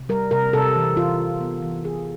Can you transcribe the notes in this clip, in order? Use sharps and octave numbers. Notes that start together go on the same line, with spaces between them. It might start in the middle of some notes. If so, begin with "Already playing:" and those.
Already playing: C3
G3 A#4
C3 A#4
C3 A4
E3
E3 F4
E3
B3
E3
E3 G#4